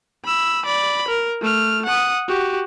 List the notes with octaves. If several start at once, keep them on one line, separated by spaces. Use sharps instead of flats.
B5 E6
D5 B5
A#4
A3 F6
F#5 D#6
F#4 G4